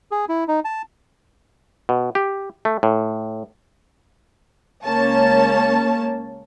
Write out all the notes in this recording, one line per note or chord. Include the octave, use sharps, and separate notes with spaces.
G#4
E4
D#4
A5
B2
G4
A3
A2
C#2 A#3 C#4 C#5 A5